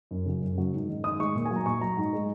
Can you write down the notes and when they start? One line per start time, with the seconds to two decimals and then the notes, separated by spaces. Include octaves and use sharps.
0.11 F#2
0.26 C#3 F#3
0.42 F#2
0.57 C#3 F#3
0.73 G#2
0.88 D#3 G#3
1.04 G#2 D#6
1.19 D#3 G#3 C#6
1.35 A#2
1.46 G#5
1.51 F#3
1.56 A#5
1.66 A#2 C#6
1.81 F#3 A#5
1.97 G#2
2.13 G#3